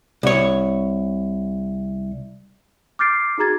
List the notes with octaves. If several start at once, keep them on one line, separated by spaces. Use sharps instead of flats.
C2 C#5
D6 F6 G6 A6 C7 D7
D#4 F#4 G#4 A#5 G#6 A6